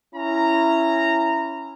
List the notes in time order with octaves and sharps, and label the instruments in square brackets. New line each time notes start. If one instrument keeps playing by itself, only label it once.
[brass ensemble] C#4 E4 A#5